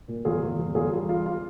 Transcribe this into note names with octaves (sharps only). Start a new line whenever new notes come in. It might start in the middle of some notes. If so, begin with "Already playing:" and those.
A#2
E2 F4 G#4
E2
E2
E2 F4 G#4
G3 F4
G3 F4
F4